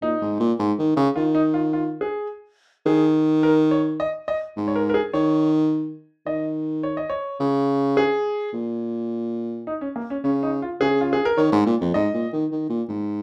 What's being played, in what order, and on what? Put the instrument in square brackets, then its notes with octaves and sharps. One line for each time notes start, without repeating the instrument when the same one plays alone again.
[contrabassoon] A#2 [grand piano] D#4
[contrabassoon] G#2
A#2
G#2
D#3
C#3
[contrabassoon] D#3 [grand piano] F4
[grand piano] D#4
F4
F4
G#4
[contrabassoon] D#3 [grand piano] G#4
[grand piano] A#4
C#5
D#5
D#5
[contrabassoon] G#2
[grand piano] C#5
A#4
A#4
G#4
[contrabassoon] D#3 [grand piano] C#5
[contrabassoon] D#3 [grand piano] D#5
[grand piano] C#5
D#5
C#5
[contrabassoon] C#3
[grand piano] G#4
[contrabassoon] A#2
[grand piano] D#4
C#4
A#3
C#4
[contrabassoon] C#3 [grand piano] C#4
[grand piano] D#4
F4
[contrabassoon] C#3 [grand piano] G#4
[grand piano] F4
G#4
A#4
[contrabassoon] D#3 [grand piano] C#5
[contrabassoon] G#2
A#2
F2
[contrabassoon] G#2 [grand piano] D#5
[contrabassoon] A#2
D#3
D#3
A#2
G#2